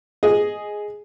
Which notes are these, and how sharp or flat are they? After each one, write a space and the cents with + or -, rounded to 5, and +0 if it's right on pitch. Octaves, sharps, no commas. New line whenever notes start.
G#4 +0 D#5 +0